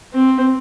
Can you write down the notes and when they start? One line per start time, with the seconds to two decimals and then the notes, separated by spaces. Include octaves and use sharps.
0.13 C4